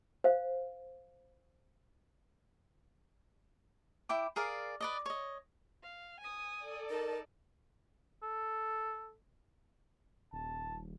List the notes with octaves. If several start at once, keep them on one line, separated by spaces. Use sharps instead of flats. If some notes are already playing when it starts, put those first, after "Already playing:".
C5 F5
E4 G5 D6
G#4 A#4 D5 F5
B4 D5 D#5
C#5 D#5
F5
G#5 D#6
A4 D5
D#4 A#4 A5
A4
D#1 A5